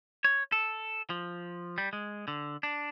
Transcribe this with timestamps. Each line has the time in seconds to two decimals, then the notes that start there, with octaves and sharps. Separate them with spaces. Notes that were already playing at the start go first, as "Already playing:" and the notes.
0.24 C#5
0.52 A4
1.10 F3
1.78 G3
1.93 G#3
2.28 D3
2.63 D4